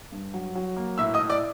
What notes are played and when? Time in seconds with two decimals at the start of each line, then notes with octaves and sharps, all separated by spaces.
0.12 G2
0.34 F#3
0.55 F#3
0.76 A#3
0.98 A2 E5 E6
1.14 D#5 D#6
1.19 A2
1.30 D5 D6